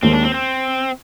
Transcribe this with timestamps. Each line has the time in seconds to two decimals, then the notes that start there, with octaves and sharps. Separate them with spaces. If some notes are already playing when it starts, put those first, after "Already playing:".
0.03 D#2 D#3 G#3 C4
0.13 D4
0.24 C4
0.34 C4